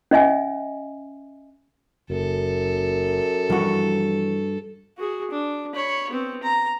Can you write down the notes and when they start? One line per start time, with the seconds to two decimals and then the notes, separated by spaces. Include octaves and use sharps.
0.11 C#4 D#5 E5 G#5
2.10 F#1 F#2 A4
3.50 G2 E3 F3 G3 F#4
4.97 F#4 G#4
5.30 D4
5.74 C#5 B5
6.10 B3 C4
6.43 A#5